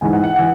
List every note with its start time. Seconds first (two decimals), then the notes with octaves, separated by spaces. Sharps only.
0.01 G#2 E3 G#5
0.13 F#5
0.24 F#5
0.36 E3 F#5